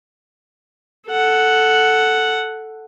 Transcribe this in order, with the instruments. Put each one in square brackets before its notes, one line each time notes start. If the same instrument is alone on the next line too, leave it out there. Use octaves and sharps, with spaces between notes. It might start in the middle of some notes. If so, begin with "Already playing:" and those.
[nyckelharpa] A4 F#5